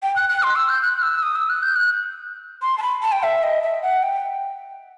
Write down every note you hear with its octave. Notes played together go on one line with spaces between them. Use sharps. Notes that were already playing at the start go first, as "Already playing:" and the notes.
G5
F#6
F#6
C6
E6
G6
F#6
E6
D#6
E6
F#6
G6
F#6
C6
A5
B5
A5
G5
E5
D#5
E5
F#5
G5